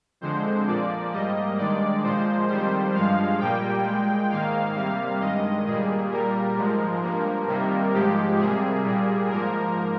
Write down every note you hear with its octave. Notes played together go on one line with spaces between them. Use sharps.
F2 D3 G#3 C5
A#2 F3 A#3 D5
G#2 G3 A#3 D#5
G2 D#3 G#3 D5
A#2 F3 G#3 C5
F2 D#3 G3 C5
G2 F3 G#3 F5
A#2 G3 A#3 G5
A#2 G#3
G#2 D#3 A#3 F5
C3 G3 A#3 F5
G2 D#3 G#3 D#5
A#2 G3 A#3 G#4
A#2 G3 A#3 A#4
G#2 F3 G#3
G2 F3 A#3
C3 D#3 G3 A#3
G#2 F3 G#3 G4
C3 G3 A#3 G#4
A#2 G3 A#3
G#2 F3 A#3 A#4